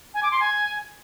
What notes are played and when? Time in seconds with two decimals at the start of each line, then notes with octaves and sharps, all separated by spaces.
0.14 G#5
0.23 D6
0.31 C6
0.40 G#5